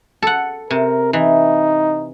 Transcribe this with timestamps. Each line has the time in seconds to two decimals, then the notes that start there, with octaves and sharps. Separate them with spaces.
0.23 A4 F#5
0.71 C3 A#4
1.13 E3 D#4